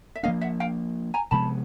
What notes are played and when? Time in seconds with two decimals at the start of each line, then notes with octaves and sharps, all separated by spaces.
0.15 E5
0.23 F3 A#3 D4 D#5 F5
0.41 E5 F#5
0.60 F5 G5
1.14 G#5 A#5
1.31 C3 F3 G#3 B3 A5 B5